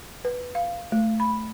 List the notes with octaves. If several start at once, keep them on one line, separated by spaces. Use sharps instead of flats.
B4
F5
A3
B5